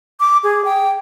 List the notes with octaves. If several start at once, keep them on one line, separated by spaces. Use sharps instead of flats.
D6
G#4
G5